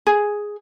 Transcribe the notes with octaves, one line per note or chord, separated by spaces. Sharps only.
G#4